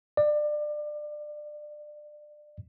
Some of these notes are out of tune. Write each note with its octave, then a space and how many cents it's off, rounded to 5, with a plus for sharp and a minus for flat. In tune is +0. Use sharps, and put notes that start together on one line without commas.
D5 +25